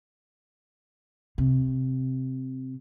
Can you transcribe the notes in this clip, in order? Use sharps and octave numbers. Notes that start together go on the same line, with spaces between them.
C3